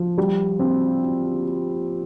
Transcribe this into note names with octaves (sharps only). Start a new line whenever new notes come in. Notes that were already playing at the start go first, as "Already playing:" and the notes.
Already playing: F3
G3
C4